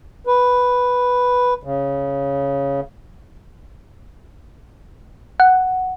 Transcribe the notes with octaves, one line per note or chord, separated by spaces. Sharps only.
B4
C#3
F#5